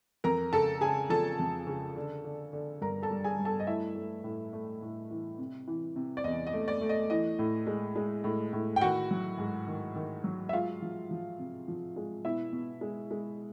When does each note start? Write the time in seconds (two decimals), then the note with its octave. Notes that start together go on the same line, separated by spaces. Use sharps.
0.24 F2 A#4 A#5
0.53 C#3 A4 A5
0.81 C#3 G#4 G#5
1.10 F3 A4 A5
1.39 F2
1.67 C#3
1.96 D3
2.24 D3
2.53 D3
2.81 G2 A#4 A#5
3.02 A4 A5
3.10 G3
3.24 G#4 G#5
3.39 G2
3.45 A4 A5
3.60 D#5
3.67 A3 E4 E5
3.95 A3
4.24 A2
4.53 A3
4.82 A2
5.10 E3
5.39 C3
5.67 E3
5.96 C3
6.17 D5
6.24 E2 D#5
6.47 D#5
6.53 A3
6.68 D5
6.81 A3
6.89 D#5
7.10 E3 D#5
7.39 A2
7.67 G#3
7.96 G#3
8.24 A2
8.53 A2
8.76 G5
8.81 D#3 F#4 F#5
9.11 F#3
9.38 G#2
9.67 D#3
9.95 D#3
10.24 F#3
10.49 E5
10.53 G#3 F4 F5
10.82 F3
11.11 F3
11.39 C3
11.68 F3
11.96 G#3
12.25 B2 E4 E5
12.53 B2
12.81 G#3
13.11 G#3